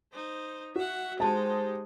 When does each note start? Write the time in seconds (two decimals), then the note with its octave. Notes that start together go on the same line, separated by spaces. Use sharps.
0.13 D#4 C5
0.76 F#4 E5 F#5
1.20 G#3 D#4 G4 C5 A5